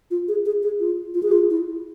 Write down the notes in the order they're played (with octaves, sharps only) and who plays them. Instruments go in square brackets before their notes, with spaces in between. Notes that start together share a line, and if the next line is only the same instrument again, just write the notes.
[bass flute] F4
G#4
G#4
G#4
F4
F4
G#4
F4
E4